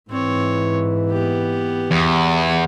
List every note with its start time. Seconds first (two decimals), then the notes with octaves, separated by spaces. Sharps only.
0.10 G#2 E3 C4 C#5
1.11 B3 G4
1.91 E2